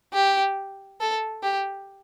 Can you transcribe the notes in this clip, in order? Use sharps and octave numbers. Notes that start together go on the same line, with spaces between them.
G4
A4
G4